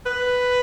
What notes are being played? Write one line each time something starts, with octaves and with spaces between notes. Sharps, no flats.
B4